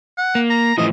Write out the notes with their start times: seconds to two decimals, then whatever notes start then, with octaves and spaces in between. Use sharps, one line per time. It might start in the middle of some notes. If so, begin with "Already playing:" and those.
0.17 F#5
0.35 A#3
0.50 A#5
0.78 A2 E3 F3 D#5